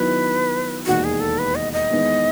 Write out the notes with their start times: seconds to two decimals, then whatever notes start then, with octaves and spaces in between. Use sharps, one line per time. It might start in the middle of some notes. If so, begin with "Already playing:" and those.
Already playing: D#3 F#3 B3 E4 B4
0.86 E1 D#2 D#3 F#4
1.04 G#4
1.20 A4
1.38 B4
1.55 D#5
1.73 D#5
1.90 E2 D#3 G#3 B3